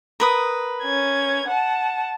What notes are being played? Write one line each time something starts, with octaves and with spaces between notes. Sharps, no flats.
A#4 B4 D#6
C#4 G#6
F#5 A5